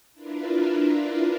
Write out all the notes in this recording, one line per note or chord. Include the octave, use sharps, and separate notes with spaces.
D4 E4 F4 A#4 B4